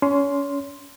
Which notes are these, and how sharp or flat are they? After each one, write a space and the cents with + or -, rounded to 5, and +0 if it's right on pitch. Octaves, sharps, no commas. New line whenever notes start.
C#4 +30 C6 +0